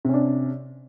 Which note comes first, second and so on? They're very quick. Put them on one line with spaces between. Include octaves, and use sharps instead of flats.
C3 C#4 D4